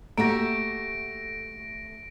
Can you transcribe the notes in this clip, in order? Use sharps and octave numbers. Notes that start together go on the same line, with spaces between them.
A3 A#3 F#4 G4 A#6 D7